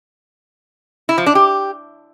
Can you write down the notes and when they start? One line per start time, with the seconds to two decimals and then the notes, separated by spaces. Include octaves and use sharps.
1.09 E4
1.18 F3
1.26 D4
1.35 G4